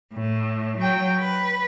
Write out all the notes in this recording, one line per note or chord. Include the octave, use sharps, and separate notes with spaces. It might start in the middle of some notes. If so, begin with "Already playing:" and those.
A2
F#3 G5
B4